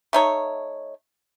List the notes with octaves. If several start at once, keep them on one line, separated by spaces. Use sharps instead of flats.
A3 D#4 C#5